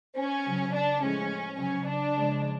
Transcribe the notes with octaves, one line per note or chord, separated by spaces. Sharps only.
C#4
C#3 F#3
D4
A2 F3 G#3 C#4
C#3 F#3 C#4
D4
C#3 F3 G#3